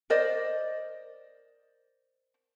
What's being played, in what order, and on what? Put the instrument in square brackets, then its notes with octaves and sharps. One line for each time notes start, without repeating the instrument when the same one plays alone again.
[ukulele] A#4 C5 D5 D#5